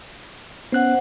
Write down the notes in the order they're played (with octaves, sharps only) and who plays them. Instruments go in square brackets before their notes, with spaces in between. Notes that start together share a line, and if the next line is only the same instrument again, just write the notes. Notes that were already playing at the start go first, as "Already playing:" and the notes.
[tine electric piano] B3 C#4 F#6 [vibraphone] C5 F#5